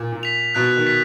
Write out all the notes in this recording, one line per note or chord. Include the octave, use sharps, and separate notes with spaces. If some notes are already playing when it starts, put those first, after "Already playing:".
Already playing: A#2
A#2
B6 F7
B2 F#6
D#3
B6